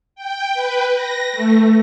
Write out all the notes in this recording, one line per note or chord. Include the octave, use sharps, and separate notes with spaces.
G5
B4
A#6
A3